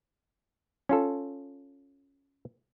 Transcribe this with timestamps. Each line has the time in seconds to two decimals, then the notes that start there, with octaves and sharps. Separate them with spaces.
0.89 C#4 F4 A4